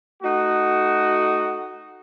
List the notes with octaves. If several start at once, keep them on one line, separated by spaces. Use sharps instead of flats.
A3 D#4 F#4